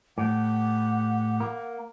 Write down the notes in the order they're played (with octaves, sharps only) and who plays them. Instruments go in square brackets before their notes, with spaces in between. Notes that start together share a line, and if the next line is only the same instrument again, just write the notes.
[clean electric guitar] A2 [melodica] G4 [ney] F#5
[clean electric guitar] A#3